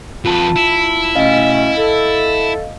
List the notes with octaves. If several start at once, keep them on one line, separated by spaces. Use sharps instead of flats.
F2 F4 B4 A5
E4
B2 A3 C#4 D#5 F5
A4